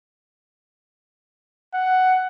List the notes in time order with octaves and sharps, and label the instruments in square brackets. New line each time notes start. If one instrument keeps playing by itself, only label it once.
[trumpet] F#5